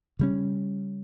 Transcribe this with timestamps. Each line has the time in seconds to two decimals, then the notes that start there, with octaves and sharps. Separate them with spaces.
0.19 C#3 G3 C#4